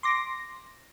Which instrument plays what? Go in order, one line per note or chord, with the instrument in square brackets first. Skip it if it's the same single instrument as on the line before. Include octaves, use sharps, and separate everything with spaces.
[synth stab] C6 D6 A#6